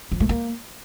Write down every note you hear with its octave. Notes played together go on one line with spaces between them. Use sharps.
F3
A3
A#3